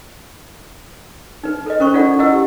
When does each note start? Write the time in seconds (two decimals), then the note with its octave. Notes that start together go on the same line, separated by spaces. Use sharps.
1.43 D#4 B4
1.66 A4 B4 D#5
1.80 C#4 A#4 C5 C#6
1.93 D#4 F4 A4 D5 F#5
2.19 E4 B4 D#5 F#5 E6
2.32 G4